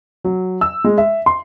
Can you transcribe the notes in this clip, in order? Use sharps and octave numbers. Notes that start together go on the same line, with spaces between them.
F#3
E6
G#3
E5
C6